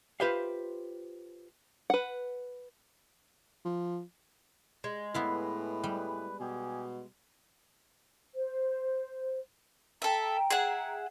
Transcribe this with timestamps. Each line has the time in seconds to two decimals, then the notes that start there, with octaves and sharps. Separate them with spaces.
0.20 F4 G4 B4 C5 E5 F5
1.90 B4 F#5
3.65 F3
4.84 G#3
5.14 A2 B3 E4 G#4 B4 F5
5.84 G3
6.40 B2 G4 G#4 G#5
8.34 C5
10.02 A4 E5 G5 A#5
10.50 G#4 E5 F#5